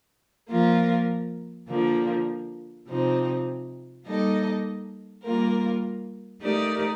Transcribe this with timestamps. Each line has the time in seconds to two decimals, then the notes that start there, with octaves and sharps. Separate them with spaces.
0.50 F3 A#3 F4 A#4
1.68 D3 F3 A#3
2.88 C3 F3 C4 D#4
4.05 G3 A#3 D#4 A4 D#5
5.24 G3 A#3 F4 A#4
6.42 A3 D#4 G4 A#4 D5